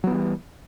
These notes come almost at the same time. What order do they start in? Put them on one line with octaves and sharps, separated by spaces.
F#3 B3 E3 G3